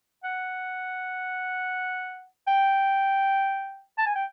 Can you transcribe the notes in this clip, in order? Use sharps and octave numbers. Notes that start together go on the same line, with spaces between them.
F#5
G5
A5
G#5
G5